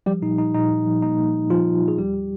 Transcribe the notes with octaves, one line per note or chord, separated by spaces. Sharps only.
F3 G3 G4
A#2 D#4
A#2 D#4
A#2 D#4
A#2
F3
A#3 D#4
A#3
A#3
F3 F4
A#3
F3
G#4
D#2 G3 G4
G3